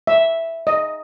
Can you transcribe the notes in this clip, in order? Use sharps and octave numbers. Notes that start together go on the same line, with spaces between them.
E5
D#5